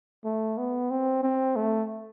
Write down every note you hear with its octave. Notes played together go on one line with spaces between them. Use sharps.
A3
B3
C4
C4
A3